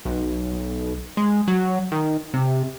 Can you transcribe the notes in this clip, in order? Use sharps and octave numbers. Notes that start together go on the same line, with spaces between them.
B1
G#3
F#3
D#3
C3